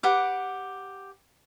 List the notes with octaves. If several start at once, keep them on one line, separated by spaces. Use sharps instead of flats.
G4 B4 F#5 D6